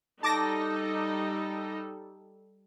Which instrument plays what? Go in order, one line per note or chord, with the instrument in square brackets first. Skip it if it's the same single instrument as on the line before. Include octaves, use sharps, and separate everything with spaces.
[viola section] G3 D#4 A4 [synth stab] A5 D6 A#6